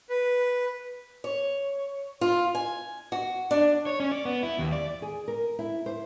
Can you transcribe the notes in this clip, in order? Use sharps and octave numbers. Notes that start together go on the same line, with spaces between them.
B4
C#5
F4
G#5
F#4
D4
C#5
C#4
D5
B3
E4
D#2
D5
G#4
A#4
E4
C5